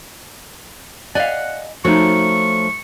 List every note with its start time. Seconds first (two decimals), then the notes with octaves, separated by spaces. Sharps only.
1.15 D5 D#5 F5 F#5 G#5
1.85 F3 A3 D#4 F#4 C#5 C#6